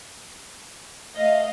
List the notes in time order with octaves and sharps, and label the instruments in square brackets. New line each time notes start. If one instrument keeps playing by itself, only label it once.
[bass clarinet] A3 [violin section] D#5 F5